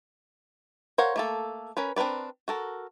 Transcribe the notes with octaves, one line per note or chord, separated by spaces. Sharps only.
A#4 C5 C#5 F5 F#5
A3 A#3 A4
C#4 A#4 B4
C4 D4 A#4 B4 D5
F#4 A4 A#4